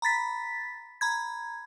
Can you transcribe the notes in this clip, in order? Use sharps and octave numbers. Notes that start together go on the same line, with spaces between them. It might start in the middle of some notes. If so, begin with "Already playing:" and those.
A#5 B5 A6 B6
A#5 B5 G#6